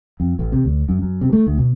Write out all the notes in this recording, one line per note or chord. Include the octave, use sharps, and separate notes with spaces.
F2
A1
C3
D2
F#2
F#2
C3
A3
D2
B2